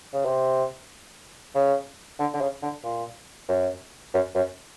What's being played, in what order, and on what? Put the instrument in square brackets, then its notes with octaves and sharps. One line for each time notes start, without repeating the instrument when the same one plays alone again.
[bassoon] C#3
C3
C#3
D3
D3
C#3
D3
A#2
F#2
F#2
F#2